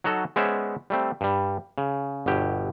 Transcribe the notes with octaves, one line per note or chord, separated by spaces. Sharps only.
F#3 D#4 F#4 A4
G#3 B3 C#4 C5 D5 E5
G3 A3 C4
G2 G3
C#3
G1 B2 G4